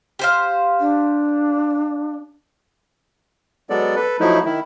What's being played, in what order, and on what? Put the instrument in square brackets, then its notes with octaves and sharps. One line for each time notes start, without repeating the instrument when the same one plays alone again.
[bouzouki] G4 C5 F5
[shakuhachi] D4
[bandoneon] F#3 G#3 B3 A4 D5
A4 B4
F3 F#3 A3 D#4 E4
D#3 E4